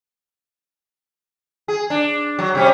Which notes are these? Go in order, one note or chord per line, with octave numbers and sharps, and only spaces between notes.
G#4
D4
F#3
C3 G3 C#4